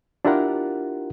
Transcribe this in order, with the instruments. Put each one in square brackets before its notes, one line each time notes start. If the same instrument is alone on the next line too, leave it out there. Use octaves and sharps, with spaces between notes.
[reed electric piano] D4 E4 F4 G4 A#4 F#5